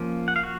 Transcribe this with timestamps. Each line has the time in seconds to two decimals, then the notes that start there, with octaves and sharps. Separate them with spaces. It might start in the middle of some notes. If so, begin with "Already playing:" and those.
Already playing: F3 A#3 C#4
0.28 F#5
0.36 F5
0.43 F#4